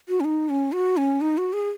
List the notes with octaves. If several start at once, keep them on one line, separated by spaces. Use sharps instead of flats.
F#4
C#4
D#4
C#4
F#4
C#4
D#4
F#4
G#4